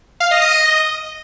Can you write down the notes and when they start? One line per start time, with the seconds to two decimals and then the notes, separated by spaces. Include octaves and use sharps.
0.20 F5
0.31 D#5
0.42 D#5